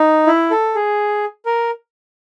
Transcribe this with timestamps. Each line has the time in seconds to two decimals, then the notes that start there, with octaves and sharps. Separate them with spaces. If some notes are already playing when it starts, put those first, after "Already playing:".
Already playing: D#4
0.27 E4
0.51 A4
0.75 G#4
1.46 A#4